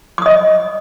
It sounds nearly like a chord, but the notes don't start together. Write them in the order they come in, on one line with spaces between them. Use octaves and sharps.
D6 D#6 D#5